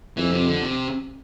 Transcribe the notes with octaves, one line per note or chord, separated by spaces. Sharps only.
F2 E3
C3
D3
C3